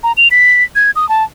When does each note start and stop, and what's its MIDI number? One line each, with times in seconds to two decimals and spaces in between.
0.04 0.12 82
0.17 0.28 101
0.31 0.64 95
0.75 0.91 92
0.96 1.08 87
1.09 1.24 81